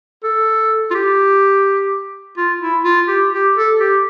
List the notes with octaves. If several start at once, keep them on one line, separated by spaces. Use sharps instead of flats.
A4
F4
G4
F4
E4
F4
G4
G4
A4
G4